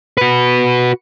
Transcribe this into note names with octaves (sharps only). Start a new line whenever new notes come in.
F#4 B4